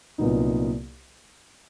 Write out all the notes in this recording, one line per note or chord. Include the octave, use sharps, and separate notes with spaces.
C2 A#2 F#3 B3 D#4